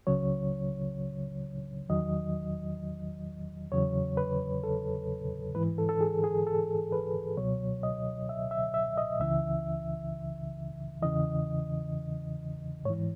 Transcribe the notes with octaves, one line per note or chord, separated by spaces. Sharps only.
C#2 C#3 F#3 C#5
E2 D#3 F#3 D#5
E2 C#3 F#3 C#5
B4
A4
G#2 E3 B4
A4
A4
G#4
G#4
A4
B4
C#2 B2 F#3 C#5
D#5
E5
E5
E5
D#5
C#2 C#3 E3 E5
E2 C#3 E3 D#5
G#2 E3 C#5